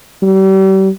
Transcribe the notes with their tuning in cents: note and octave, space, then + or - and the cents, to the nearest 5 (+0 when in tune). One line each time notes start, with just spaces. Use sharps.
G3 -40